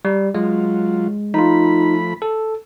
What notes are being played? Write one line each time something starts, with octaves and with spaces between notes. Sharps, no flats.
G3
F#3 G#3 F4
F3 A3 D#4 F4 B5
A4